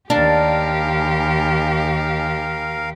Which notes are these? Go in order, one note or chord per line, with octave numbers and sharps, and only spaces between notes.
D#2 D4 G4 A#4 F5